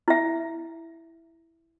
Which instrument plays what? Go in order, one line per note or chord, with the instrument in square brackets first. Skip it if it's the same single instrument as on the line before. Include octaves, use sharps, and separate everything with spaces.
[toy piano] E4 E5